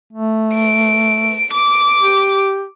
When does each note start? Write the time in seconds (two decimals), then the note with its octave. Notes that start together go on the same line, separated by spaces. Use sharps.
0.13 A3
0.53 D7
1.53 D6
1.99 G4